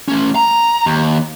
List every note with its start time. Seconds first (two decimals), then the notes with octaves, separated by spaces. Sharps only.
0.08 A3 C#4
0.35 A#5
0.86 D#2